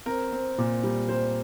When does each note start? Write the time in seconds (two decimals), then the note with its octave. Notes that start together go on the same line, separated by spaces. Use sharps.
0.06 C4 A#4
0.32 C4
0.58 A#2
0.84 G3
1.08 G3 C5